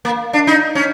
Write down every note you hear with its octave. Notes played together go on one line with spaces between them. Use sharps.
A#3
D4
D#4
C#4